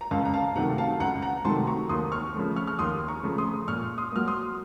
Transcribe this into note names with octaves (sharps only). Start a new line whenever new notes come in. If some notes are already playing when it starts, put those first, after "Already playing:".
A#5
C#2 F5 A5
A#5
F5 A5
C3 D#3 F#3 A3 F#5 A#5
F5 A5
C#2 F#5 A#5
F#5 A#5
C3 D#3 F#3 A3 A5 C6
A#5 C#6
D#2 C6 D#6
C#6 F6
C#3 F3 A3
C#6 F6
F6
D#2 C6 D#6
A#5 C#6
C#3 F3 A3
C6 D#6
A#2 C#6 F6
C6 D#6
F#3 A#3 F6
C6 D#6